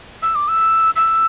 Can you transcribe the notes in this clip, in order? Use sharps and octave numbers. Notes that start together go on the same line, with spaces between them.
E6
D6
E6
E6